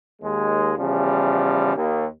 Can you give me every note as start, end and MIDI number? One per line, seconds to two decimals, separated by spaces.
0.22 0.72 39
0.22 0.72 56
0.78 1.74 40
0.78 1.74 49
0.78 1.74 53
0.78 1.74 55
1.76 2.05 39